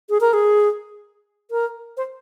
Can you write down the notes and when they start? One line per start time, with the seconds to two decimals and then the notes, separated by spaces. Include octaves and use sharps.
0.10 G#4
0.21 A#4
0.33 G#4
1.51 A#4
1.97 C5